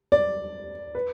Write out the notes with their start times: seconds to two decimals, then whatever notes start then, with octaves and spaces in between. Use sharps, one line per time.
0.12 D5
0.95 B4